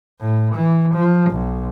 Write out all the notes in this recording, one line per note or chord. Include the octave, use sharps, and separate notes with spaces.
A2
E3
F3
B1